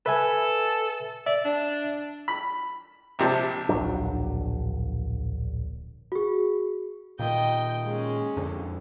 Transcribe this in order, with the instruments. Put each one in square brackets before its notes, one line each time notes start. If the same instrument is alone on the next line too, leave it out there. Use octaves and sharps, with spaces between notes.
[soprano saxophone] A4 [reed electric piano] B4 E5 G#5
[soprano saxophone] D5 [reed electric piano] E5
[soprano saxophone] D4
[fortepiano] B5
A#1 C3 A5
[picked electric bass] D1 A#1 F#3 D4
[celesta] F#4 G#4
[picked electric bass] A#2 D#3 [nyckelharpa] D#5 G5
[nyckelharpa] G#3 C#4
[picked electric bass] F2 D3